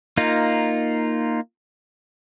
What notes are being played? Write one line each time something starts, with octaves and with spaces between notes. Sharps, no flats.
A#3 D#4 F4